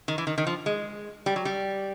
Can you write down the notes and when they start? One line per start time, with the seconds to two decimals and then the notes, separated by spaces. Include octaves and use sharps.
0.08 D#3
0.18 E3
0.27 D#3
0.38 D#3
0.47 F3
0.66 G#3
1.26 G3
1.36 F#3
1.45 G3